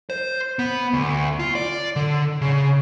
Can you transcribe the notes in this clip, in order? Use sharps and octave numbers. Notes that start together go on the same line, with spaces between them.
C5
B3
D2
F4
D5
D3
C#3